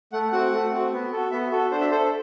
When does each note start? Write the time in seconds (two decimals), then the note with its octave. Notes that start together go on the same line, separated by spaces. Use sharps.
0.13 A3 F#5
0.32 C4 F#4 F#5
0.53 A3
0.73 C4 F#4
0.92 B3
1.12 F#4 A4
1.31 B3 E5
1.51 F#4 A4
1.71 D4 C5
1.81 E5
1.91 A4 C5